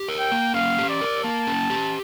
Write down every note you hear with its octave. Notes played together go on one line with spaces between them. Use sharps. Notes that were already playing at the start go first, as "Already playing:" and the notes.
Already playing: G4
A#4
G5
A#3
C#4 F5
G4
D5
A#4
A#3 A5
C#4
G4